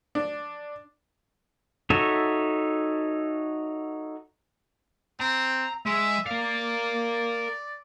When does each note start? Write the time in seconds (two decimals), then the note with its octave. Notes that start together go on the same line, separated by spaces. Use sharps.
0.15 D4
1.90 D#4 F#4 A4 C#5 E5
5.20 C4 A#5
5.86 G#3 E5
6.26 A#4 D5 F5